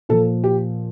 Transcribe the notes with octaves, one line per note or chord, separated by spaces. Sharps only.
A#2 F3 A4
G4